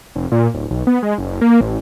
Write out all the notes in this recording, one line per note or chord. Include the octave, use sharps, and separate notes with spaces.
F1
A#2
D1
B1
B3
G#3
F#1
A#3
A1